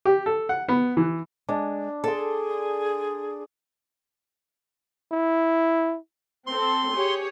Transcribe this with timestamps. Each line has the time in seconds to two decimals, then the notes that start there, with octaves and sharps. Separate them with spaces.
0.05 G4
0.26 A4
0.49 F#5
0.68 B3
0.97 E3
1.49 G#3 D4
2.04 G#4 A4 D5 C6
5.12 E4
6.47 C4 A4 C6
6.95 G4 G#4 C#5